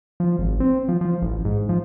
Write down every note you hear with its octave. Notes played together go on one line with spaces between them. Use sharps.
F3
G#1
C4
F3
F3
A1
G#2
F3